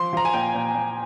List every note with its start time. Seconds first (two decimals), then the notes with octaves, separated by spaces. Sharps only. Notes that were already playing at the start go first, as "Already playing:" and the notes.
Already playing: F3 C6
0.13 F3 A#5
0.25 G#5
0.33 A#2 G5
0.54 A#2
0.75 A#2